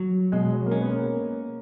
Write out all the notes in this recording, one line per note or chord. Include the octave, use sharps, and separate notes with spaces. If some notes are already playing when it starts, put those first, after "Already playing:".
Already playing: F#3
B2 G#3
F#3
A#3
G#3 C#4
B3
A#3